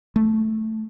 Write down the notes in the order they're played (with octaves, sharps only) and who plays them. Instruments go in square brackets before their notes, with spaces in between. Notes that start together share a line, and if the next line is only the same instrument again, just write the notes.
[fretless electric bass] A3